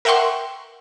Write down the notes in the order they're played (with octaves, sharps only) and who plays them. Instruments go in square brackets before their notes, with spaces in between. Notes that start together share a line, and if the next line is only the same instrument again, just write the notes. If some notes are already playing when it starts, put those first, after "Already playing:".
[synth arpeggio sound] A#4 E5 F#5 G5 C6 C#6